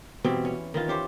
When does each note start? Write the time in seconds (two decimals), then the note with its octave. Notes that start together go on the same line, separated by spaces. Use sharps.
0.24 B2 E3 G3 C4
0.45 C#4
0.74 D#3 E3 F4
0.88 C#4 G4 C5